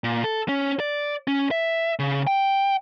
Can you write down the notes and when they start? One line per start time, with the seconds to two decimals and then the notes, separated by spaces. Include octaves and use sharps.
0.04 A#2
0.24 A4
0.49 C#4
0.80 D5
1.28 C#4
1.51 E5
1.99 C#3
2.27 G5